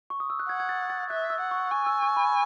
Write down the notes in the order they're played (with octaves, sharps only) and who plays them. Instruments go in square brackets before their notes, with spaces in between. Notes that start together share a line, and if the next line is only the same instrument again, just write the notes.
[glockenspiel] C#6
D#6
E6
F#6
[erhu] F#5 [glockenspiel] G#6
[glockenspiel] G#6
A6
A6
[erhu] E5 [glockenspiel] F#6
[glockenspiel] E6
[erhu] F#5
[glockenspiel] C#6
[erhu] G#5 [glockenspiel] C#6
[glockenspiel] E6
C#6
B5